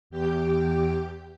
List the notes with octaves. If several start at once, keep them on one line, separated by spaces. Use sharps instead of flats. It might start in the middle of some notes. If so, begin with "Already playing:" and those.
E2 G4 G5